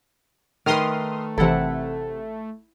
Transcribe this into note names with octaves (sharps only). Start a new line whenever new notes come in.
D#3 A3 B4 C6 D#6 F6
G#1 C3 E3 E4 A4 F#5